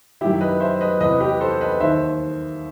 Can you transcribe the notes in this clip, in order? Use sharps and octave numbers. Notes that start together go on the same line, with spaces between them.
F#2 D#3 E4 G4
B4 D#5
C5 E5
B4 D#5
E2 C3 E3 B4 D#5
G4 B4
A4 C5
B4 D#5
D#2 D#3 C5 E5